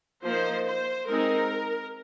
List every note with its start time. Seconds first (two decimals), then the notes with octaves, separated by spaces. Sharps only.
0.24 F3 A#3 D#4 C5
0.66 C5
1.08 G#3 C4 D#4 A#4